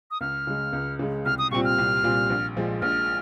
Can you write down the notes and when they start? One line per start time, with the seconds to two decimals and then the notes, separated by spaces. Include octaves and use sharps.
0.11 D#6
0.21 C#2 F6
0.47 C#3 G#3
0.73 C#2
0.99 C#3 G#3
1.25 C2 F6
1.38 D#6
1.51 A#2 G3 C4 F4 C#6
1.64 F6
1.78 C2
2.04 A#2 G3 C4 F4
2.30 A#1
2.56 A#2 F3 G#3
2.82 A#1 F6